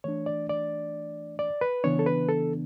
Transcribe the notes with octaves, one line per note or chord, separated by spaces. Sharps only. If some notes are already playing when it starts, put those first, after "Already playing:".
E3 A3 D4 C#5
D5
D5
D5
B4
C#3 E3 B3 D4 C#5
A4
B4
A4